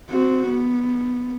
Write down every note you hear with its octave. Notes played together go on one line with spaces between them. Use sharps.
C4 F#4
B3